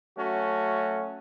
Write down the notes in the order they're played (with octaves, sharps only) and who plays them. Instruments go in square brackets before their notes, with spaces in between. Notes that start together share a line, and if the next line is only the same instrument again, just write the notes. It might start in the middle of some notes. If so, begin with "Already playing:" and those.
[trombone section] F#3 A3 C#4 F#4